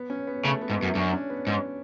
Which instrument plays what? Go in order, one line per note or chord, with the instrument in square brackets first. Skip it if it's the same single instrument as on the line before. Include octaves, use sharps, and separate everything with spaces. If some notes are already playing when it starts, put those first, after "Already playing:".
Already playing: [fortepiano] B3
C#4
B3
[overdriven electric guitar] C#3 [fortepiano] A3
[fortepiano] B3
[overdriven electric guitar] G#2
[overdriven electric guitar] F#2 [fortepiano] B3
[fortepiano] E4
[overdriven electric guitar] F#2 [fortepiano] D4
[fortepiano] C#4
B3
[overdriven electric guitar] G#2 [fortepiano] C#4